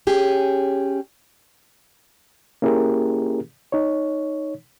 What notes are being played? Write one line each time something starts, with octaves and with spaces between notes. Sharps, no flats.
C#4 G4 G#4
A#3 C#4 E4 G4 G#4 A#4
D#4 C#5